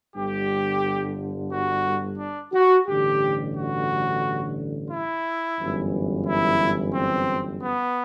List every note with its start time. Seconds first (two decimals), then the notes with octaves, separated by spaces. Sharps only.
0.15 G1 G2 D3 G4
1.51 F#4
2.18 D4
2.53 F#4
2.87 A1 G2 D3 G4
3.55 F#4
4.90 E4
5.59 G1 F#2 E3
6.26 E4
6.94 C4
7.62 B3